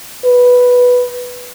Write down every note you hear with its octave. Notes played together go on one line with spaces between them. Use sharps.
B4